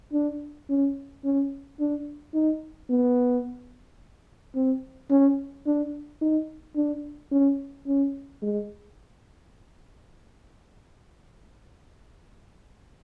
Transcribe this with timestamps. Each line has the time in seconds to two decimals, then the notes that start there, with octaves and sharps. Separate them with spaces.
0.13 D4
0.69 C#4
1.25 C#4
1.80 D4
2.34 D#4
2.90 B3
4.55 C4
5.10 C#4
5.66 D4
6.21 D#4
6.76 D4
7.31 C#4
7.87 C#4
8.42 G#3